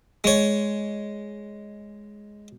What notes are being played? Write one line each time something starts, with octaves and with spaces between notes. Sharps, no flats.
G#3 C#5